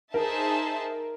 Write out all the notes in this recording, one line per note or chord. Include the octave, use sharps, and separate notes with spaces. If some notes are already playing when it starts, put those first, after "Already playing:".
D#4 G#4 A#4 C5 E5 A5